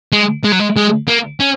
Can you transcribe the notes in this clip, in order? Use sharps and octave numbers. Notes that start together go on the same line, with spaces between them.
G#3
G#3
F#3
G#3
G#3
A#3
C#4